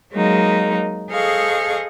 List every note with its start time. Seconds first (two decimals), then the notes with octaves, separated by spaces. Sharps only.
0.12 F#3 G#3 A#3 D#4
1.11 G#4 A4 C5 D#5 F5 C#6